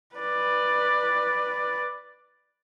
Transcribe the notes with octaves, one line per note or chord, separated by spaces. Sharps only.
B4 D5